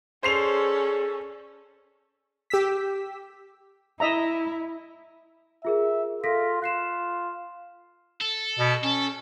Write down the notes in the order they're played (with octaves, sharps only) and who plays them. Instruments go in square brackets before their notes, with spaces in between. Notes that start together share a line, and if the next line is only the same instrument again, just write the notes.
[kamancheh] C#4 A4 [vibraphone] G#4 D5 [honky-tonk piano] C5 C7 F7
[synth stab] G4 E6 B6
[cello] E4 [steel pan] D#5 E5 A#5
[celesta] F4 G#4 A#4 [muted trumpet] E5
[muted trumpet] F4 [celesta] A4 A#6 B6
[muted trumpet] F4 [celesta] F#6 C7 E7
[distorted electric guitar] A4
[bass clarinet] B2
[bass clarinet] C#4 [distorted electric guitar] A4